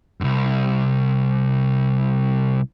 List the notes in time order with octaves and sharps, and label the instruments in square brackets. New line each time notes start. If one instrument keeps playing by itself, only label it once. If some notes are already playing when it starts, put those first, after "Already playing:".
[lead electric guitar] C2 F#2